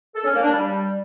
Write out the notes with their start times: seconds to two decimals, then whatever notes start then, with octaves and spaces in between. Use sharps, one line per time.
0.15 A4
0.24 C#4
0.33 A#3
0.42 D4
0.52 G3